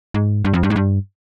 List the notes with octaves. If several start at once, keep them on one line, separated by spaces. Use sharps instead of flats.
G#2
G2
F2
G2
G#2
G2